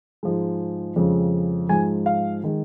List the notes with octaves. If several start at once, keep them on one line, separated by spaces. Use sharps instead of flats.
G#2 F3 G#3
F2 C#3 F3 G#3
G#2 F3 G#3 G#5
F5
D#3 G#3